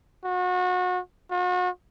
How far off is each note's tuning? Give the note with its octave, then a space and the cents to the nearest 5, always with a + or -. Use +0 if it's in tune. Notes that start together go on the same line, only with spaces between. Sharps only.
F#4 -30
F#4 -40